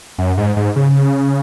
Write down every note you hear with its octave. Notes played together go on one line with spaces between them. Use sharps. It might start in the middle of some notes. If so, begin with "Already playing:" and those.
F#2
G#2
G#2
C#3